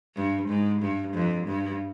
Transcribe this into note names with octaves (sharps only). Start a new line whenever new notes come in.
G2
G#2
G2
F2
G2